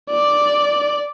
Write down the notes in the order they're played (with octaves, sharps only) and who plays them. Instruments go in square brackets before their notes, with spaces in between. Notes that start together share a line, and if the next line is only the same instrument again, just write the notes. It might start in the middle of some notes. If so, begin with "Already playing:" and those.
[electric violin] D5